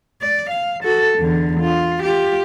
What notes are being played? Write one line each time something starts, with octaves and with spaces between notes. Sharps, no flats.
D5
F5
F#4 A4
E2 D3
F4
F4 G4